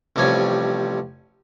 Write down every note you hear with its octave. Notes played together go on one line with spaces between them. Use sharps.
A1 C3 F3 G3 C#5 G#5